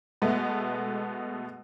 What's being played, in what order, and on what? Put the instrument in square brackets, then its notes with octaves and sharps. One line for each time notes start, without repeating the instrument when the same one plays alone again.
[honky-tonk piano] B2 G#3 A3 B3